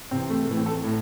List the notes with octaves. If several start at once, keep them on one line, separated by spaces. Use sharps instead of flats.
C3 E3 C4
A3
A2 E3 A3
C4
A4
A2